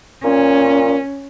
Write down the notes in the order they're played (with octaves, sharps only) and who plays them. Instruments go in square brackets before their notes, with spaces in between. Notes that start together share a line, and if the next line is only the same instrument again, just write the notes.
[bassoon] A#2 [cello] C#4